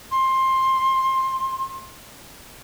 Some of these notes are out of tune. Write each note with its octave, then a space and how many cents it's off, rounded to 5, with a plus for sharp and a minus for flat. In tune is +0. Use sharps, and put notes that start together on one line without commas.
C6 +15